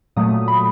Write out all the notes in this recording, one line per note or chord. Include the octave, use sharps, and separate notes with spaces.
A#2 F#3 A3 D#6
B5